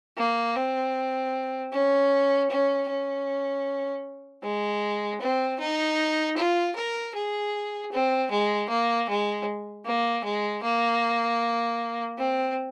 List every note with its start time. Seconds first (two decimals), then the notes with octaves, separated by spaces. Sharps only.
0.17 A#3
0.56 C4
1.72 C#4
2.50 C#4
2.89 C#4
4.43 G#3
5.20 C4
5.59 D#4
6.37 F4
6.76 A#4
7.15 G#4
7.91 C4
8.30 G#3
8.69 A#3
9.08 G#3
9.85 A#3
10.24 G#3
10.63 A#3
12.18 C4